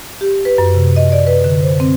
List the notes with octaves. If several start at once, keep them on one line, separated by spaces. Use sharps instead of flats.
G4
B4
F#2
C3
D#5
D5
B4
D3
C5
C4